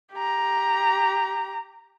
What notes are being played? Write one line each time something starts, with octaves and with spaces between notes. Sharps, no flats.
G4 A#5